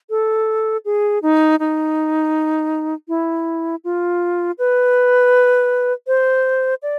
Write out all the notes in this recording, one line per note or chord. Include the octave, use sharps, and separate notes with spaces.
A4
G#4
D#4
D#4
E4
F4
B4
C5
D5